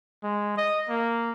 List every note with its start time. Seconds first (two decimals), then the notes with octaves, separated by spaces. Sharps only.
0.24 G#3
0.58 D#5
0.89 A#3